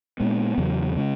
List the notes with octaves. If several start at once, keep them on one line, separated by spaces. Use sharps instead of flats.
A#2 G#3 B3
E2 C#3 F#3
C#3 G#3 C#4